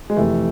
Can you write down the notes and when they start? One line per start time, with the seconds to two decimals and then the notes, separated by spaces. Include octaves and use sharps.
0.10 G#3
0.17 F2 C3 E3 A3